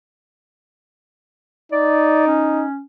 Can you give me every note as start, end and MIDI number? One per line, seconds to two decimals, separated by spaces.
1.72 2.66 63
1.72 2.22 74
2.27 2.82 61